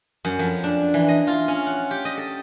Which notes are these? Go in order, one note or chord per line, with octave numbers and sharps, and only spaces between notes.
F#2
F2
D4
E3
D#5
F4
C#4
F#5
G4
D#5
A4